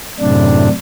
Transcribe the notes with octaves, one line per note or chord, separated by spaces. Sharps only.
F#2 A2 C3 D4